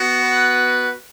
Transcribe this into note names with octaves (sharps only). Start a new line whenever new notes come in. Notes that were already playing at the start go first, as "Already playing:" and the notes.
Already playing: B3 F#4
B4